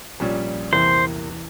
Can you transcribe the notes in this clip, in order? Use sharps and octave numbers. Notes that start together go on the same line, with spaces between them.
A#1 A#2 G3 C#4
E2 C3 E3 A#3 E4 C5
E3